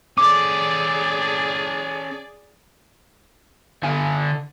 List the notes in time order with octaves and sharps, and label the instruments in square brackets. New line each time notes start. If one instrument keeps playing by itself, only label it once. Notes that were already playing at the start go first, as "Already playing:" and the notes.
[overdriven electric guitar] C#4 A4 [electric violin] G#4 D5 [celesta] D6
[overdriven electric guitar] D3 G#5